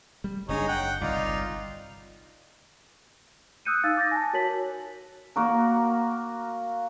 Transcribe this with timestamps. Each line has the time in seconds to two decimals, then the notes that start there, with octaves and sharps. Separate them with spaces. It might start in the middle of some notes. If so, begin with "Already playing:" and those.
0.24 G3
0.49 F#1 C4 D4 D#4 G#4 C#5
0.68 F#5 G5
1.01 G1 C2 D#4 F4 D5
3.65 D#6 E6 F#6 G6 C#7 D#7
3.83 D#4 F5 E6 A6
3.97 D6 G6 A6 A#6
4.11 G#5 A5
4.33 F#4 A#4 C#5 B6 F#7
5.36 A#3 F#4 A#4